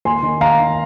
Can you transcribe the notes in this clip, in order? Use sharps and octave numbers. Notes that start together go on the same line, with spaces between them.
D#2 G#5 C6
D#3
D#3 F5 A#5
D#3